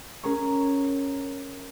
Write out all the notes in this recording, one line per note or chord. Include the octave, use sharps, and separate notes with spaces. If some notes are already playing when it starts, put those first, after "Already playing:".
C#4 G#4 A#4 C#5